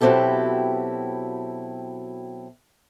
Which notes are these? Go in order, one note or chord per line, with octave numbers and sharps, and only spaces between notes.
B2 F#3 C4 E4 G4 A4